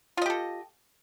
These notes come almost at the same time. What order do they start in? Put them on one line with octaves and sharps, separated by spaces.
F4 D#5 G4 A4